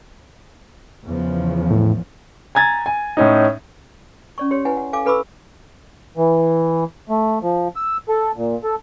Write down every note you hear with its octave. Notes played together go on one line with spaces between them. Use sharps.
E2 C#3 F3
A2
G#5 A#5 G#6 A6
G#5
A2 C#4 D#4
C#4 D5 C#6
G4 C#5 C6
E4 B4 F#5 G#5
F#5
A4 F5 G#5 D6
A4 B4 B5 C#6 D6 E6
E3
A3
F3
E6
A4
A#2
A4